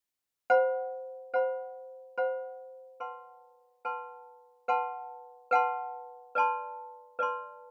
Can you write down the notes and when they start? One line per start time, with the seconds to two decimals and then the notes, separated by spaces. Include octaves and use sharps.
0.50 C5 F#5 B5
1.34 C5 F#5 B5
2.18 C5 F#5 B5
3.00 B4 F#5 A5 C6
3.85 B4 F#5 A5 C6
4.68 B4 F#5 A5 C6
5.51 B4 F#5 A5 C6
6.35 B4 D5 A5 C6
7.19 B4 D5 A5 C6